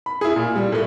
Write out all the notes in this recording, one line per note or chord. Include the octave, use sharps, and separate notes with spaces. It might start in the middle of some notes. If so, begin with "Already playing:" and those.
B5
E4 G#4
A#2
G3
A2 A3